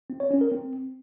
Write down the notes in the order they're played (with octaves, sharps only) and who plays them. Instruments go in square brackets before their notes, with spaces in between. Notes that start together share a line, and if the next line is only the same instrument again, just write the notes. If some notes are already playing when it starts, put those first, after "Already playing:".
[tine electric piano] C4
C#5
C#4
A#4
C4